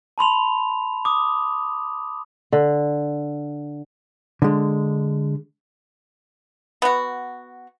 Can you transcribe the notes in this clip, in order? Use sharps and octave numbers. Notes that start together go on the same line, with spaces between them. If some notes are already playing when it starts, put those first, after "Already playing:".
A5 B5 C6 F7
D6 D#6
D3
D3 G#3
B3 F#4